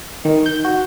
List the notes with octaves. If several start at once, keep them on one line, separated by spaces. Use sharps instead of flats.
D#3
G6
F#4